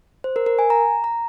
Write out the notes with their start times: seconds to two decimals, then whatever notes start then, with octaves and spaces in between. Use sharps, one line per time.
0.24 C5
0.36 A#4
0.46 A#4
0.59 G#5
0.70 A#5
1.04 A#5